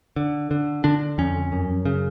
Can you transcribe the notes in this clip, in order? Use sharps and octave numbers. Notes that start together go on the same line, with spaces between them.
D3
D3
D3 D4
F2 C#4
F#2
C#3